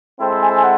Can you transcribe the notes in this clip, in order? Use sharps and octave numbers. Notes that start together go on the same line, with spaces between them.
G#3 C4 E4 A4 C5 G5
G#5
A5
G#5
F#5